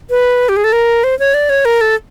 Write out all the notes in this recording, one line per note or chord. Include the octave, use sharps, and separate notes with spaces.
B4
G4
G#4
A4
A#4
C5
C#5
D5
C#5
A#4
A4